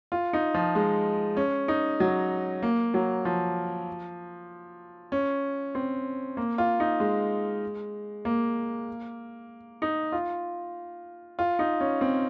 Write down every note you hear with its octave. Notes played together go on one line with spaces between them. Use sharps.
F4
D#4
F3
G#3
C#4
D#4
F#3
A#3
F#3
F3
C#4
C4
A#3
F4
D#4
G#3
A#3
D#4
F4
F4
D#4
C#4
C4